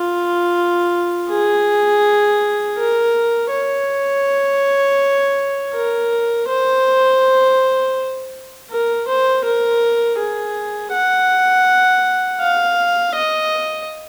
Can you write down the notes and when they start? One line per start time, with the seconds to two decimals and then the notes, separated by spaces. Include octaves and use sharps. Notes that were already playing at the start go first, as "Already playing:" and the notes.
Already playing: F4
1.30 G#4
2.78 A#4
3.51 C#5
5.74 A#4
6.49 C5
8.70 A#4
9.08 C5
9.45 A#4
10.19 G#4
10.93 F#5
12.40 F5
13.15 D#5